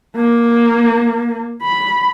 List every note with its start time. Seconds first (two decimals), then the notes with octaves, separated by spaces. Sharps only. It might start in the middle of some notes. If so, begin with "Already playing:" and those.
0.16 A#3
1.62 B5